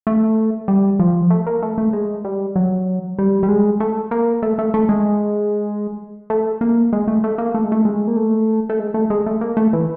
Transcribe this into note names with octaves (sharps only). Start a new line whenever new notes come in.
A3
G3
F3
A3
A#3
A3
A3
G#3
G3
F#3
G3
G3
G#3
A3
A#3
A3
A3
A3
G#3
A3
A#3
G#3
A3
A3
A#3
A3
G#3
A3
G#3
A#3
A3
A3
G#3
A3
G#3
A3
A#3
A3
E3